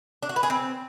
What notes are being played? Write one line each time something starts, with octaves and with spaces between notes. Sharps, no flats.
D4
F#4
B4
G#4
C4